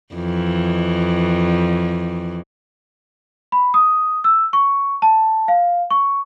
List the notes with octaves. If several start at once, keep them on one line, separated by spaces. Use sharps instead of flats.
F2 E3
B5
D#6
E6
C#6
A5
F5
C#6